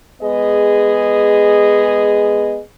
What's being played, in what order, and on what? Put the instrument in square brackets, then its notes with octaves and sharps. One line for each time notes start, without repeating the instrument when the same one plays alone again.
[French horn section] G#3 B3 G#4 D#5